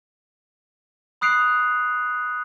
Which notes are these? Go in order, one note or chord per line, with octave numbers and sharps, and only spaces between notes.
B5 D#6 F#6 C7 D7 F7